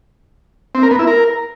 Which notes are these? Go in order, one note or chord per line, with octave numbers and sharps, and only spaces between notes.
C4
A#4
B3
E4
A#4